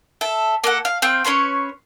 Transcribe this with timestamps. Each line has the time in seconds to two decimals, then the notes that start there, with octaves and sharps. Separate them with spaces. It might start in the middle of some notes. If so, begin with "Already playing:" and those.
0.21 A4 E5
0.64 A#3 A4 F#5
0.85 F5
1.02 C4 F5 G5
1.25 C#4 B4 C#5 C6